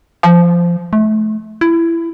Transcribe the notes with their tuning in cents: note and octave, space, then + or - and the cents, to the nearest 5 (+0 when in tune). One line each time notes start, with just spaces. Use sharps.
F3 -15
A3 -30
E4 +20